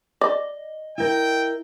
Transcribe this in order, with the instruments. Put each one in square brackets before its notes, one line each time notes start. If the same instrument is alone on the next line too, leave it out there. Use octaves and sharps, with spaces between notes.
[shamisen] D5 [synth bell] D#5
[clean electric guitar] E4 A#4 [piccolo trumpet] G5